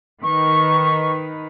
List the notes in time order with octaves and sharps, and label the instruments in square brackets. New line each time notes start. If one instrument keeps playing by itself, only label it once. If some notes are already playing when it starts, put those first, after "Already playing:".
[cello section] D#3 B4 [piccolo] C#6